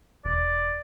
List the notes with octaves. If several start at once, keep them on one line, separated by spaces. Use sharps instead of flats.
E1 D5